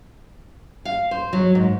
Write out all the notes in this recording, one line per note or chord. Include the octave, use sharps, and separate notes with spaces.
F5
C5
F#3
G#2